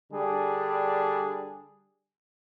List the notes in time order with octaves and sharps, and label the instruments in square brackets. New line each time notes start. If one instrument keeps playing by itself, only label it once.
[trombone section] D3 G3 D4 G#4